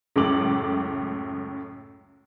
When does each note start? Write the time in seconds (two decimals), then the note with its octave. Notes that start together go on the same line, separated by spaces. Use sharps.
0.16 C#2 F#2 A2 A3 D6 F#7